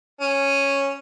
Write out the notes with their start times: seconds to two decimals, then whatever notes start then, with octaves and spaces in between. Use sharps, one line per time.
0.21 C#4